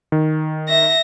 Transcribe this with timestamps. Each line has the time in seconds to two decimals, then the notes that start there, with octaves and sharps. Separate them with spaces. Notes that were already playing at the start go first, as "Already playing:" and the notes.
0.12 D#3
0.69 E5 A#6